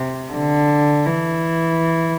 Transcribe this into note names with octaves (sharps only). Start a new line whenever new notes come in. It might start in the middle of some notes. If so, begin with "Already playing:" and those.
Already playing: C3
D3
E3